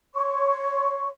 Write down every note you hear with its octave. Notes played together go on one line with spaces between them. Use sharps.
C#5 C6 C#6